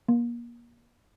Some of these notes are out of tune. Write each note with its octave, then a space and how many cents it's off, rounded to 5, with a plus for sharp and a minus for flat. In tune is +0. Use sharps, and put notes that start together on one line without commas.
A#3 +30